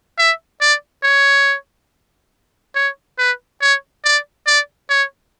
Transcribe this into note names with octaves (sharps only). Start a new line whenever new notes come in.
E5
D5
C#5
C#5
B4
C#5
D5
D5
C#5